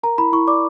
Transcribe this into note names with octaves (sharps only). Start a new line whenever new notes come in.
A#4 A#5
E4 B5
E4 C#6
D5 D6